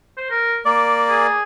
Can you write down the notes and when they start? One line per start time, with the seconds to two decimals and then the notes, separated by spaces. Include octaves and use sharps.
0.18 C5
0.30 A#4
0.66 A#3 D5 D6
1.10 G#4